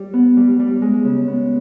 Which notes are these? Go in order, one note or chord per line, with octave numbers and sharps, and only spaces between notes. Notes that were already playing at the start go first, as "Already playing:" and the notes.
Already playing: G3
B3
G3
G3
G#3
C#3
B3